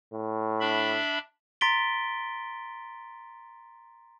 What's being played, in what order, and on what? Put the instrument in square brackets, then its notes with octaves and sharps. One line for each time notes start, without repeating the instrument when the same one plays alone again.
[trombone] A2
[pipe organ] D4 E5 B5
[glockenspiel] A#5 C6 A6 B6 D7 G7